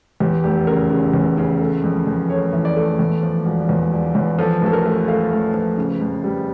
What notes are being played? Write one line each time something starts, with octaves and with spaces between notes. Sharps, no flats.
E2 G4
F1 G4
C#3 A#4
C#3
E2
C#3
A3
F2
F2
A3 C#5
E3
D5
A3
E2
F3
E1
E2
E1
E2
F3 A4
A1 A4
A#4
A3
A3 F5
A1
F3
C#3
F2
G3